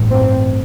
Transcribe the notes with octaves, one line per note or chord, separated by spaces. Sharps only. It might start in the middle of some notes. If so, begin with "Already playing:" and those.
Already playing: A1 G2
C4